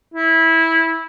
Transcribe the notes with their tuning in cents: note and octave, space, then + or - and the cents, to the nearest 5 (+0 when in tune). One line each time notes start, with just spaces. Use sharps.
E4 -15